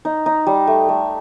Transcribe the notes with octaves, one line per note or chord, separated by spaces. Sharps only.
D#4
D#4
G3
A3
A3